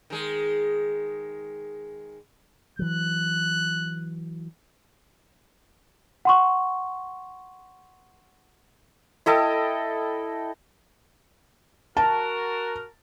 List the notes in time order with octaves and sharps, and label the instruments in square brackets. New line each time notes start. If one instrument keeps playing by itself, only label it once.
[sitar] D#3 G#3
[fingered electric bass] E3 F#3 [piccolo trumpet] F#6
[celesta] F#5 C6 C#6
[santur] E4 A4 D#5 G5
[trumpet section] F#4 A#4 [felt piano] A5